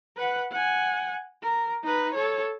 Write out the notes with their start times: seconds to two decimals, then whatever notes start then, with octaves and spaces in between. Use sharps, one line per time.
0.17 B4 F#5
0.51 F#5 G#5
1.42 A#4
1.83 D#4 B4
2.14 A4 C#5